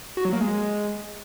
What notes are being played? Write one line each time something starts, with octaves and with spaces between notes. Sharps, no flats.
F#4
F#3
A#3
G#3